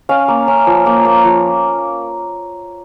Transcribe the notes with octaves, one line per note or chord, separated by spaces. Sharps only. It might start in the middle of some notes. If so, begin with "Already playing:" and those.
C#4 F5
A#3
C#4
F3
A#3
A#3
F3